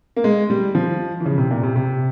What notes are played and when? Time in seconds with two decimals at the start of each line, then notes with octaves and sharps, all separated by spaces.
0.16 A#3
0.24 G#3
0.50 G3
0.75 F3
1.20 E3
1.26 C#3
1.38 C3
1.51 A#2
1.63 C3
1.76 C3